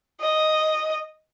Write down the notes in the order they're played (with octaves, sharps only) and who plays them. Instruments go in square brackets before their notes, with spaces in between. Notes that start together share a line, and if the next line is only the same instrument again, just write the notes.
[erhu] D#5